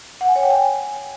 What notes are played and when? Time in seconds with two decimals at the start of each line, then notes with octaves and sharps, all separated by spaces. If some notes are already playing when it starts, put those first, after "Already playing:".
0.21 F#5
0.28 G#5
0.36 C#5
0.43 G5
0.51 G#5